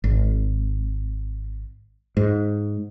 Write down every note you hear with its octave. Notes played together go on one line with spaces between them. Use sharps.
G#1
G#2